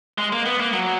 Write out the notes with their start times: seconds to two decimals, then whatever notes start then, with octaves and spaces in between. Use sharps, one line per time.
0.18 G#3
0.32 A#3
0.46 B3
0.60 A#3
0.73 F#3